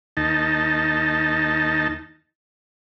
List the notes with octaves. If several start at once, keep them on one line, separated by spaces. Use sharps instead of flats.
D#2 D#4 A5